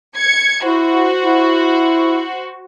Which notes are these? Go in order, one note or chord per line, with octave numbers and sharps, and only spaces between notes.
G#6 C#7
E4 F#4 C5
E4